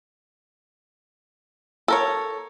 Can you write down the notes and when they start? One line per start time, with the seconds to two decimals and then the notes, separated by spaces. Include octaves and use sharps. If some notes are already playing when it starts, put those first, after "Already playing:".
1.88 A4 A#4 C#5